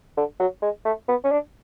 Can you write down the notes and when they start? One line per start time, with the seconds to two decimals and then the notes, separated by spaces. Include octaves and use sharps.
0.17 D3
0.40 F#3
0.62 G#3
0.85 A3
1.08 B3
1.24 C#4
1.31 D4